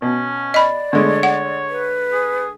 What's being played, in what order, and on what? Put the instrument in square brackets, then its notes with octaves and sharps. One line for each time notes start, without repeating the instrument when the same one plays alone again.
[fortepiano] B2 [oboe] C#4
[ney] D5 [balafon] D#5 B5
[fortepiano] D3 G#3 A3 [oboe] C#5
[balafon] F#5
[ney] B4
[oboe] G#4